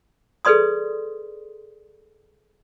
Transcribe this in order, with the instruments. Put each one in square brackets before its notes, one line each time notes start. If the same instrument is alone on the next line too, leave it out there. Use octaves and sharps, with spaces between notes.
[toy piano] G#4 A4 B4 D5 C6 D#6